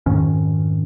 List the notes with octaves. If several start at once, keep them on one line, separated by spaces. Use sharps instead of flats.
F2 G#2 D#3 C#4